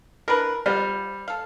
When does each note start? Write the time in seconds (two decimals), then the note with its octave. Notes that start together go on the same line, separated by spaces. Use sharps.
0.28 D4 E4 A#4 B4
0.66 G3 F4 C5 F#5
1.28 A4 F5